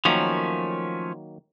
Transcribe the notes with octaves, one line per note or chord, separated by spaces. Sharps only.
D#3 F3 F#3 A3 A#3 C#4